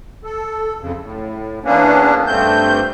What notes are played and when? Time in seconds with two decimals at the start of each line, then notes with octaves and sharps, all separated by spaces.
0.24 A4
0.80 F2 C#3
1.00 A2
1.64 E2 A#3 B3 C#4 D4
2.27 G2 A3 C4 G6